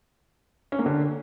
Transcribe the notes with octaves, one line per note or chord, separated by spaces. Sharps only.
C#4
A#3
D3